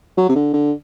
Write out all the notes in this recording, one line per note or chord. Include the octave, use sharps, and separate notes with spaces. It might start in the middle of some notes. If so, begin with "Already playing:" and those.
F#3
C3
D3
D3